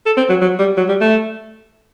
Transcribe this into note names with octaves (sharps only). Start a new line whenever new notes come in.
A4
C4
F#3
F#3
G3
F#3
G3
A3